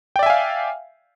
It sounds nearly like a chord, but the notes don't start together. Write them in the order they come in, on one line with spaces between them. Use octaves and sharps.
G5 D5 E5 G#5 F5